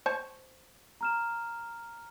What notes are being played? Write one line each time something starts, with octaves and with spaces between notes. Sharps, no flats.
C5 C#5 A5
A#5 F6 E7